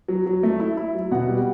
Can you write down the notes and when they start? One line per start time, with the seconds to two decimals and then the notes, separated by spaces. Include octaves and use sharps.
0.08 F#3
0.26 F#3
0.43 A3
0.60 E4
0.77 E4
0.95 F#3
1.11 B2 F#5
1.28 G3